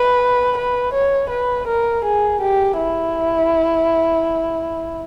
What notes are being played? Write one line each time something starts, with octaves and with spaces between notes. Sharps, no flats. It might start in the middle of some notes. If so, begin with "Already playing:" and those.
Already playing: B4
B4
C#5
B4
A#4
G#4
G4
E4